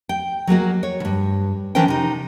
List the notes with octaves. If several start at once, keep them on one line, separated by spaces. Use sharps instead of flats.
G5
F#3 G#3 A#3 F#4
C#5
D2 G2
E3 C#4 D4 A#4 C5 G5
C3 D#4